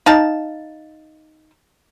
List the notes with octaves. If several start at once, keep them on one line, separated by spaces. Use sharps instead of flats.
D#4 F5 A5